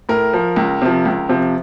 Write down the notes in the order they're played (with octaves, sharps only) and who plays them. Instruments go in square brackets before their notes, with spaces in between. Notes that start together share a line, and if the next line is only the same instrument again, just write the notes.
[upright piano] A2 A#4
F3
C#2
C3 F3
C#2
C3 F3